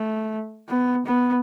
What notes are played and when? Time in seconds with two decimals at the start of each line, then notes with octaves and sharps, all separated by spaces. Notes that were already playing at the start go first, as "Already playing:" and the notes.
Already playing: A3
0.69 B3
1.06 B3